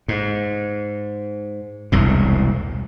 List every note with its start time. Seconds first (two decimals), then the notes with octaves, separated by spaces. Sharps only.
0.08 G#2
1.92 E1 C2 A2